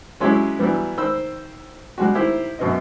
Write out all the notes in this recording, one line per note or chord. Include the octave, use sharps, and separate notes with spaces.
F#3 G#3 C#4 E4 G4
E3 F#3 G3 B3
D#3 C5 B5 E6
G3 G#3 F#4
D#3 E4 G4 C5
F#2 B2 B3 D#5